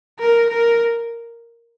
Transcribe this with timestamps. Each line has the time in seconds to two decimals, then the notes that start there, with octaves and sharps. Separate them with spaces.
0.19 A#4
0.50 A#4